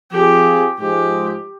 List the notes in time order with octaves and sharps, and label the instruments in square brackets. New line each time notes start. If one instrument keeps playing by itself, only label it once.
[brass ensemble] F3 C4 F4 G#4 [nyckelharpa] G4
[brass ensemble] G#2 F3 G#3 [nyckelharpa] G4